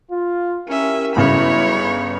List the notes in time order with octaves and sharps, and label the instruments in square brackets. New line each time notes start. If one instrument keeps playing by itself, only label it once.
[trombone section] F4
[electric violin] C#4 E5 [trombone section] E4 G4 A#4
[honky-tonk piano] G1 C#3 [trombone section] F#3 E4 [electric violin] C#5 B5